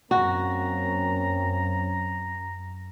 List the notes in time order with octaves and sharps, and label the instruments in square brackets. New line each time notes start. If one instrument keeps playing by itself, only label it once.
[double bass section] F#2 [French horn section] A#3 C4 C#4 [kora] F#4 [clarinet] A#5